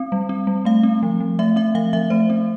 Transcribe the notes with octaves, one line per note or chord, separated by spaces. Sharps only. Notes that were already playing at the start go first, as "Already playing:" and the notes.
Already playing: C4 F5
G3
C4
G3
A3 F5
C4
F3
F3
A3 E5
C4 E5
F3 F5
F3 E5
A3 C5
C4